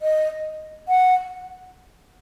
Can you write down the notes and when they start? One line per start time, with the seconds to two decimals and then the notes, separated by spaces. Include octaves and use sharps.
0.02 D#5
0.88 F#5